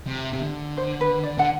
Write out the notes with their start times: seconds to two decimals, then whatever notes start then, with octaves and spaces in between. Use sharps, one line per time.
0.07 C3
0.33 C3
0.42 D3
0.77 C5
1.01 B4
1.23 D5
1.38 D3 F#5